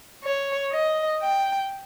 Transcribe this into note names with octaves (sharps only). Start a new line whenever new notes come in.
C#5
D#5
G5